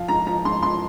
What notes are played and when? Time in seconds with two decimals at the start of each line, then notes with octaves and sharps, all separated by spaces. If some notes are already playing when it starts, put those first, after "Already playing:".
Already playing: F3 F5
0.08 G#2 A#5
0.27 F3 A#5
0.45 G#2 C6
0.63 F3 C6